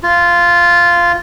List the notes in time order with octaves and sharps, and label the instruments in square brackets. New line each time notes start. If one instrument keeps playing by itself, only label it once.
[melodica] F4